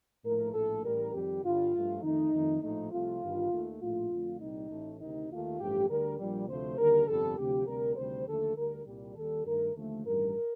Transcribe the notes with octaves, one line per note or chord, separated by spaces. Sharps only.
A#1 A2 F3 A3 A#4
A#1 A2 A3 A4
A1 A2 G3 A#4
F2 D#3 G3 G4
G1 G2 D3 G3 F4
G2 F3 A3
F2 D#3 A3 D#4
F2 D#3 A3
A#1 A2 F3 A3 D#4
C2 C3 F3 A3 F4
G1 G2 D#3 G3
D#2 D#3 A3
A#1 A2 A3 F4
F2 D3 A3
C2 A#2 G3 D#4
A1 A2 A3
D2 C3 D#3 D#4
D#2 D#3 A3 F4
A1 G2 F3 A3 G4
D2 D3 G3 A#4
A#1 A#2 G3
D2 C3 F3 A3 C5
D#2 D3 G3 A#4
G1 F2 C3 G3 A4
D2 C3 F3 G4
D2 C3 G3 A#4
D2 C3 D#3 G3 C5
D#2 D3 F3 A3 A4
D2 D3 G3 A#4
C2 A#2 G3
D#2 D#3 G3 A4
G2 D#3 A3 A#4
D#2 D3 F3 A3
A1 G2 D#3 G3 A#4